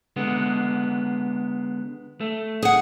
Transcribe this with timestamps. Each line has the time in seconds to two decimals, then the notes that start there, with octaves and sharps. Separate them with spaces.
0.16 D3 G#3 B3
2.21 A3
2.62 G#4 F#5